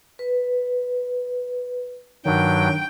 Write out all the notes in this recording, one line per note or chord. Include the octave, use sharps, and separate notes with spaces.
B4
G2 D#3 F#3 G5